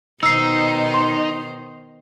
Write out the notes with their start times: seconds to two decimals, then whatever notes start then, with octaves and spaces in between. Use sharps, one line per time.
0.23 B2 D#3 D#4 C5 E6 C7
0.94 C6